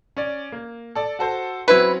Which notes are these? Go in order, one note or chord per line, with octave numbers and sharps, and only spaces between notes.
C#4 D5
A#3
A4 D5
F#4 A4 C5
F#3 C4 C#4 E4 B4